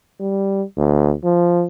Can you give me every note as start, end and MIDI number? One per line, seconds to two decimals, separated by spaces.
0.20 0.63 55
0.77 1.13 38
1.24 1.66 53